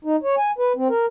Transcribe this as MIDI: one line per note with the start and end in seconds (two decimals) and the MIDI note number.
0.04 0.16 63
0.23 0.35 73
0.38 0.51 80
0.58 0.73 71
0.76 0.88 60
0.89 1.06 70